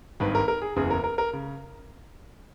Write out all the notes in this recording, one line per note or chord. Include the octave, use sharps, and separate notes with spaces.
G#1 G2 D#3 B4
A#4
A#4
G#4
F#1 E2 C#3 G#4
A#4
A#4
A#4
C#3